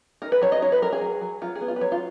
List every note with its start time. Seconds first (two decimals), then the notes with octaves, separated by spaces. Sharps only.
0.22 D#4 A#4
0.32 B4
0.41 F#3 C#5
0.52 D#5
0.62 D#4 C#5
0.72 B4
0.82 F#3 A#4
0.92 G#4
1.01 F#3
1.21 F#3
1.42 F#3 F4
1.55 G#4
1.61 B3
1.68 F4
1.76 B4
1.81 F#3 C#5
1.92 F4